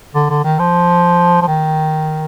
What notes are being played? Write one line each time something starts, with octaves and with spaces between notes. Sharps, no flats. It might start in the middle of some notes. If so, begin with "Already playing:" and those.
D3
D3
D#3
F3
F3
D#3